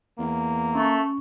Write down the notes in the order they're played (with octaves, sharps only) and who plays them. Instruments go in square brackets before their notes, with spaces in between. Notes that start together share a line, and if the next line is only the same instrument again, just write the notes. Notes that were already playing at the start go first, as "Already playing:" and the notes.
[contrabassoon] E2 [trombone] A#3
[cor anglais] A3 [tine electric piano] C#4 C#6